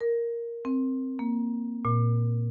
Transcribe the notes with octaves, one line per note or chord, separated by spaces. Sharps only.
A#4
C4
A#3
A#2